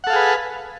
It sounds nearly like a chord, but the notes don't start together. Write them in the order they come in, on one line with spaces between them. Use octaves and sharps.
F#5 A4 F5 G#4 B4